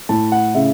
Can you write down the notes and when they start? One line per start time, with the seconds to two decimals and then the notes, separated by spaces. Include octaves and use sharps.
0.09 A2 A5
0.32 F#5
0.54 C#3 E5